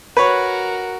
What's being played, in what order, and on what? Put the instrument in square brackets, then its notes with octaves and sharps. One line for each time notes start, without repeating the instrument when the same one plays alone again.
[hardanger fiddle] F#4 A#4 [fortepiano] B4 C#5